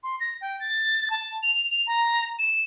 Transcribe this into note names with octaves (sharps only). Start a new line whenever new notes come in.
C6
A#6
G5
A6
A5
F7
F7
A#5
E7